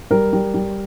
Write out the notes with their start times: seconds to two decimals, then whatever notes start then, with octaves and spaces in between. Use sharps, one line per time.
0.11 G3 A#4
0.33 G3
0.54 G3